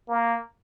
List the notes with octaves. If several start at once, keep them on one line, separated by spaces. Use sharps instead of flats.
A#3